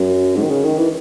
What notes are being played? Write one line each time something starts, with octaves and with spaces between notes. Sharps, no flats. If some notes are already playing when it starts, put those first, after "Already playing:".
Already playing: F#2
G#2
D#3
C#3
D#3
E3